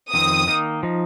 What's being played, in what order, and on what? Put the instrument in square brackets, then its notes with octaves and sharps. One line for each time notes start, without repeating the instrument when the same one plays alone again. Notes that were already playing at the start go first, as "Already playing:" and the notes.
[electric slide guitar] F2 D#3 C4 [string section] D#6
[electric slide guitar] D#3 A#3 D#4
F3 D#4